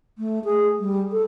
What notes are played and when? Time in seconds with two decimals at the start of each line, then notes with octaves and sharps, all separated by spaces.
0.18 A3
0.45 G#4
0.80 G3
1.12 A4